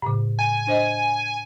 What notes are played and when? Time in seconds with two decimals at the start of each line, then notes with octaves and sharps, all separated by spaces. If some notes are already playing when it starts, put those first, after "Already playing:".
0.02 A2 C#3
0.39 G#5
0.67 D4 C5 D#5